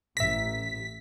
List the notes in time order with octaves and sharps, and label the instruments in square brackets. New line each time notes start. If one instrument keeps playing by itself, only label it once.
[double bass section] A1 [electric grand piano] E5 A#6 [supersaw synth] B6